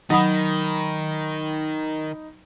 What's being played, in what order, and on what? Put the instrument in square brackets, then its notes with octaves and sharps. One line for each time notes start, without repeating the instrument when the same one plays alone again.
[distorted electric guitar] D#3 [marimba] F#3 F#5 D#6 [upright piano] D#4 B5